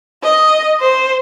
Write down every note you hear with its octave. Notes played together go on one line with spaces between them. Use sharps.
D#5
C5